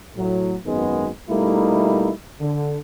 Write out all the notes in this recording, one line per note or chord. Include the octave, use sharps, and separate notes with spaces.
A2 F#3
G#1 F#2 D#3 G#3 B3
B2 G3 A3 A#3 D#4 E4
D3